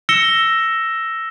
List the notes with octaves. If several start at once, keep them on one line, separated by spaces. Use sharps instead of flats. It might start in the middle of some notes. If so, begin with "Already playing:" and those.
E6 A#6 C#7 E7 G7